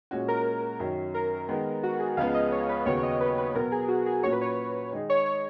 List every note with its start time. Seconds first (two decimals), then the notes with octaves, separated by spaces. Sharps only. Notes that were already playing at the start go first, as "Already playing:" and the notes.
0.11 A#2 G#3 C#4 F#4
0.28 A#4
0.79 F#2 D#3 F#3 C#4
1.14 A#4
1.49 D#3 G#3 B3
1.83 F#4
2.00 G#4
2.17 C#2 C#3 F3 G#3 B3 F5
2.34 D#5
2.52 C#5
2.69 B4
2.86 D#2 C#3 F#3 B3 C#5
3.03 D#5
3.21 B4
3.38 B4
3.55 B2 F#3 B3 A#4
3.72 G#4
3.88 F#4
4.06 G#4
4.23 A#2 F#3 A#3 C#4 F#4 C#5
4.32 B4
4.41 C#5
4.92 D#3 G#3 D#4 G#4
5.10 C#5
5.26 C#5